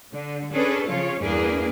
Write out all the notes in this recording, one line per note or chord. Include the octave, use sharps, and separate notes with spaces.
D3
C#4 D4 G#4 A4 B4
C#3 F3 F4 C#5
E2 G2 A#3 D4 G#4 B4